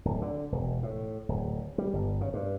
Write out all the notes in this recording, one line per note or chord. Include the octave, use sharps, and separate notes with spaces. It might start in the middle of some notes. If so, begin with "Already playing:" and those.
D1
D3
E1
A2
D1
G3
G1
C#3
G2